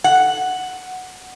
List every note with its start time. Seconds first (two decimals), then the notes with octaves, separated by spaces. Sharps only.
0.04 F#5